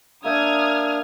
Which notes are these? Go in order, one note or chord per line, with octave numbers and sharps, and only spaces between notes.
A#3 D4 E5 G5 D#6 F6 G#6